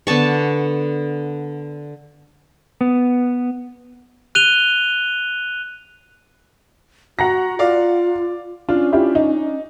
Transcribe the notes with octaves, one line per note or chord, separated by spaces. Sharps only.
D3 B3 A5 C#6
B3
F#6 D#7 F7 G7
F#4 F#5 A#5 A#6
F4 D5 F5 D6
C#4 D4 F4
E4 F4 G4
D#4